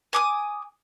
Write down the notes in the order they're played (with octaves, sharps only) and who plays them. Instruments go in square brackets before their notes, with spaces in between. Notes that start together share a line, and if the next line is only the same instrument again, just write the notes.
[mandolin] G#5 D6 D#6